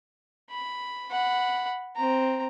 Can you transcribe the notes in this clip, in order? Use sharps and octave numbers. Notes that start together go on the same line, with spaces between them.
B5
F#5 B5
C4 A#5